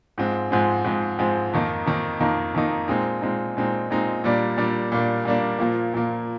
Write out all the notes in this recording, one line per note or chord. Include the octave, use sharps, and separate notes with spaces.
G#2 F3 G#3 C4
G#2 F3 G#3 C4
G#2 F3 G#3 C4
G#2 F3 G#3 C4
F2 D#3 A#3 D#4
F2 D#3 A#3 D#4
F2 D#3 A#3 D#4
F2 D#3 A#3 D#4
A#2 G#3 C4 D#4
A#2 G#3 C4 D#4
A#2 G#3 C4 D#4
A#2 G#3 C4 D#4
A#2 G3 A#3 D4
A#2 G3 A#3 D4
A#2 G3 A#3 D4
A#2 G3 A#3 D4
A#2 F3 A#3
A#2 F3 A#3